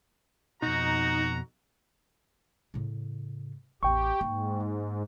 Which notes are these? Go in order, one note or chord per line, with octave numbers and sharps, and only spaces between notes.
F2 B2 D#4 F#4 A#5
A2 C#3
A1 E2 G4 G5 C#6
G#2 A#3